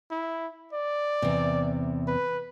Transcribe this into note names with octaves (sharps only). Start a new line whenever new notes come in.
E4
D5
E2 C3
B4